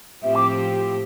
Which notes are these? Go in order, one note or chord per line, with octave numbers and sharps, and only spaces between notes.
A2 F3 C4 G4 E5
D6